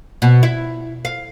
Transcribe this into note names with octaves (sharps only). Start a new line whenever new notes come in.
B2
E4
F5